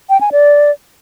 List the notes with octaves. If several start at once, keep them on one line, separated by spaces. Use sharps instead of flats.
G5
G#5
D5